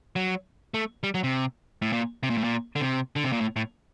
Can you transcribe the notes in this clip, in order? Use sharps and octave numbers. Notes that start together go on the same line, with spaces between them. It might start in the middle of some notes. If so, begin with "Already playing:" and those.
F#3
A3
G3
F#3
C3
A2
A#2
C3
A#2
A2
A#2
D3
C3
D3
C3
A#2
A2
A2